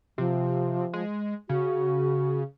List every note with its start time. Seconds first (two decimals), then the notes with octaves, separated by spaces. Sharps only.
0.18 C3 F3
0.93 G#3
1.49 C#3 F#4